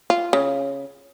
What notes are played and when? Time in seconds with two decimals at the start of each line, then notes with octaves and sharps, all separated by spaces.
0.10 F4
0.33 C#3